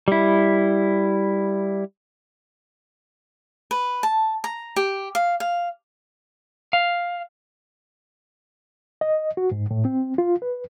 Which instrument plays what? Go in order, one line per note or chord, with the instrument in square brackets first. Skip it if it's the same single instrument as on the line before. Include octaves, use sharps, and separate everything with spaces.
[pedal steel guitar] G3 E4
[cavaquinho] B4
A5
A#5
G4
F5
F5
[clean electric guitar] F5
[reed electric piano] D#5
F#4
G#2
A2
C4
F4
B4